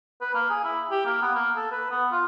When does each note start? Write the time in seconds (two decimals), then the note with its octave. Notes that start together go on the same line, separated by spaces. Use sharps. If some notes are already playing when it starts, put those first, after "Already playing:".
0.21 B4
0.34 A#3
0.50 G#4
0.64 E4
0.91 G4
1.06 A#3
1.22 B3
1.35 A#3
1.56 A4
1.71 B4
1.90 B3
2.11 F4